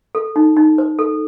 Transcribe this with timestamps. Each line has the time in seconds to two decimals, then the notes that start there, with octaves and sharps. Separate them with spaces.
0.15 A4
0.36 D#4
0.56 D#4
0.78 C5
0.99 A4